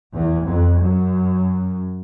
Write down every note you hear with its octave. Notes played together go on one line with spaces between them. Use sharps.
E2
F2
F#2